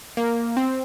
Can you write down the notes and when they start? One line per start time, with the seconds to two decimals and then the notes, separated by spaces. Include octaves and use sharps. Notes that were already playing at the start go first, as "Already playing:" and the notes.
0.17 A#3
0.57 C4